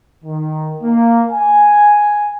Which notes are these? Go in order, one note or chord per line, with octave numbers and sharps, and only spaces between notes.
D#3
A#3
G#5